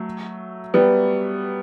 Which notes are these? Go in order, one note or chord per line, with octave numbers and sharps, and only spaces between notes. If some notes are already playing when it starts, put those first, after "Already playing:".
Already playing: F#3 A3
G3 B3